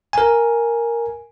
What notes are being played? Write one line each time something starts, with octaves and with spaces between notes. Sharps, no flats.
A#4 G#5